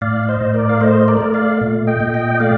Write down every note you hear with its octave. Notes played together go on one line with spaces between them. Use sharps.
A2 D5 F5
D5
C5 D#5
A2
A#4 D5
F5
A3 C5 D#5
A#4 D5
A3
D5 F5
A#2
D#5 G5
A#2
D#5 G5
D#5
A3 D5 F5